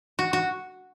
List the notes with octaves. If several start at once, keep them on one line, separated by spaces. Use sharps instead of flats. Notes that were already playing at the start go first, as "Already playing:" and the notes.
F#4
F#4